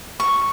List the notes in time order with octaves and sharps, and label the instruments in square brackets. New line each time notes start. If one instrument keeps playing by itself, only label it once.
[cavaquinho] C#6